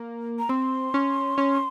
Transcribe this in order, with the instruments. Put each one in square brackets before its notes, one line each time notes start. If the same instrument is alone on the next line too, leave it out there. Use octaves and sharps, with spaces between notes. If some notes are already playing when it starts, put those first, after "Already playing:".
Already playing: [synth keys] A#3
[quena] A#5
[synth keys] C4 [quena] C6
[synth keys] C#4
C#4